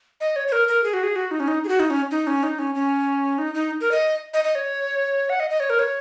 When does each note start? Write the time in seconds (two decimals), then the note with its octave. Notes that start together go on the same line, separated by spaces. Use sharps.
0.21 D#5
0.36 C#5
0.48 C#5
0.52 A#4
0.68 A#4
0.84 G#4
0.94 F#4
1.03 G#4
1.16 F#4
1.31 D#4
1.40 C#4
1.48 D#4
1.64 G#4
1.69 F#4
1.80 D#4
1.90 C#4
2.11 D#4
2.27 C#4
2.43 D#4
2.59 C#4
2.75 C#4
3.38 D#4
3.54 D#4
3.81 A#4
3.91 D#5
4.34 D#5
4.44 D#5
4.55 C#5
5.30 F#5
5.40 D#5
5.50 D#5
5.60 C#5
5.70 A#4
5.79 C#5